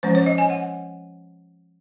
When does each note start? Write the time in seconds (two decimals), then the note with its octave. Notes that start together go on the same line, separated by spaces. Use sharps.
0.03 F3 G#3 C#4 C5
0.15 C#5
0.26 D#5
0.38 G#5
0.50 F#5